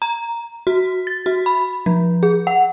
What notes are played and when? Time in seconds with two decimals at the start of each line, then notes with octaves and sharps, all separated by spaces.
0.02 A#5
0.67 F#4
1.07 A6
1.26 F#4
1.46 B5
1.86 F3
2.23 G#4
2.47 F#5